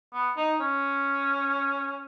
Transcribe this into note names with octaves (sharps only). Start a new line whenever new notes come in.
B3
D#4
C#4